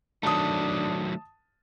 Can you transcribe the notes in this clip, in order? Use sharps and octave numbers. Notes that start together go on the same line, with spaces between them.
D#3 F#3 A3 D4 A5 D#6